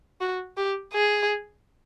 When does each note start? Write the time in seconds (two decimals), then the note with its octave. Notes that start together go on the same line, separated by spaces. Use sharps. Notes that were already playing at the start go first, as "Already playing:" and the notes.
0.21 F#4
0.57 G4
0.93 G#4